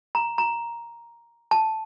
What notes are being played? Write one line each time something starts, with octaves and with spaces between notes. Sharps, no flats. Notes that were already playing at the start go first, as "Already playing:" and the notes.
A#5
A#5
A5